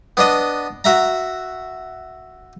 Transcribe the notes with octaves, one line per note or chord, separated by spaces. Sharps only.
B3 D4 D#5
F#4 E5 A#5